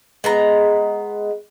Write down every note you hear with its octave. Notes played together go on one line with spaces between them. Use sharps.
G#3 B3 A#5